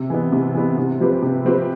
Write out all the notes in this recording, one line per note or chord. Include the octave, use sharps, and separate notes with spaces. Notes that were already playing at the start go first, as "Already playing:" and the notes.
Already playing: C3
E3 B3
C3
E3 B3
C3
F3 C4 G4 B4
C3
F3 C4 G4 B4